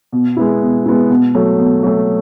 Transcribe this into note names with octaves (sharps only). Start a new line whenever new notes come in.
B2
G#3 B3 E4
B2
G#3 B3 E4
B2
F#3 A3
B2
F#3 A3